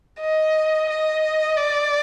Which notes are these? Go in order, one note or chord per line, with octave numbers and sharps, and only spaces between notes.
D#5
D#5
D5